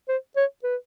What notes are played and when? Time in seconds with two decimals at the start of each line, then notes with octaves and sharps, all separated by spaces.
0.09 C5
0.36 C#5
0.64 B4